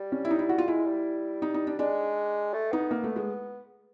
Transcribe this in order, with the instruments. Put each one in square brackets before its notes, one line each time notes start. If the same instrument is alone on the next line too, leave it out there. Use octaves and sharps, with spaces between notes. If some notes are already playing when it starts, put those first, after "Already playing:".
Already playing: [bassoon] G3
[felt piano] C#4
E4
D#4
E4
F#4
F4
[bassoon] G#3 [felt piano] E4
[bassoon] G3
[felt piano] D#4
D#4
D4
[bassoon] G#3 [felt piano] D4
[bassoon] A3
[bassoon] B3 [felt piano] D#4
[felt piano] A#3
A3
G#3